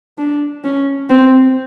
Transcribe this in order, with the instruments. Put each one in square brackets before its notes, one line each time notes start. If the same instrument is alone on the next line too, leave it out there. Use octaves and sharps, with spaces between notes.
[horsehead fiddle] D4
C#4
C4